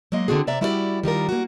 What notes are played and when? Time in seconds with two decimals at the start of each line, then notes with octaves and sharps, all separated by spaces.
0.12 F#3 G#3 A#3 D#5
0.28 D3 C4 F4 F#4 G#4
0.47 C3 D5 E5 A#5
0.61 G3 E4 F#4 G4 B4 D5
1.03 D#3 G3 F4 A#4
1.29 A#3 F#4